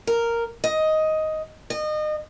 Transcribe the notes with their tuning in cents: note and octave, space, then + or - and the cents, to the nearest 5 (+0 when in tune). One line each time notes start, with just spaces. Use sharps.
A#4 -5
D#5 +10
D#5 -30